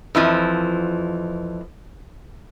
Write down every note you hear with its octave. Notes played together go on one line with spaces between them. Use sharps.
F2 E3 F3